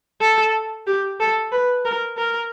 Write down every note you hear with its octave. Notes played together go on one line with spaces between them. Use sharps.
A4
G4
A4
B4
A#4
A#4